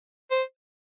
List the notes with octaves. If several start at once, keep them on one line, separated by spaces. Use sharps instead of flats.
C5